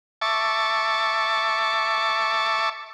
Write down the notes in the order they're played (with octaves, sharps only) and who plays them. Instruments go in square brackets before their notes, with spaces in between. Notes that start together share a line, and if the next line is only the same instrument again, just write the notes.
[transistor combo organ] E5 A5 C#6 D6